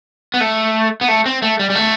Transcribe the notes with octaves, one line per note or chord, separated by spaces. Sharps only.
B3
A3
B3
A3
C4
A3
G3
G3
A3